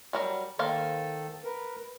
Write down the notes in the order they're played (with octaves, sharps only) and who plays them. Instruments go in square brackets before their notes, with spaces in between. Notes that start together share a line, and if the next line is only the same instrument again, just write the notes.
[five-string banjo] F#3 G3 A#4
[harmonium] D#3 A4 [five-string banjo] A#3 C5 F5
[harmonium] A#4 B4